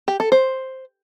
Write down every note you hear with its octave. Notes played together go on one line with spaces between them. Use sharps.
G4
A4
C5